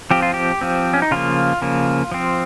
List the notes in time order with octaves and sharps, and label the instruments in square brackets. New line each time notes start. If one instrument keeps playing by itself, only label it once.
[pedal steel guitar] F3 C4 G4
F4
G4
F3 C4
C#4
D#4
C#3 F3 A#3 F4
C#3 F3 A#3
F3 C4